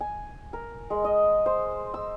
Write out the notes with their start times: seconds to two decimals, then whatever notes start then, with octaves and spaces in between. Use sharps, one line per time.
0.01 G#5
0.53 A#4
0.90 G#3
1.04 D#5
1.46 C5
1.94 E6